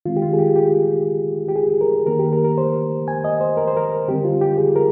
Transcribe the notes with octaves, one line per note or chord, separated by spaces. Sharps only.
D#3 G#3 C4 F4
G4
F4
G#4
G4
G4
G4
G#4
A#4
D#3 A#3 A#4
G4
A#4
A#4
C5
G#5
D#5
C5
A#4
C5
A#4
D3 G3 C4 G4
F4
G4
G#4
A#4